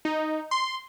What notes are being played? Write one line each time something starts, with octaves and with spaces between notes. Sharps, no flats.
D#4
C6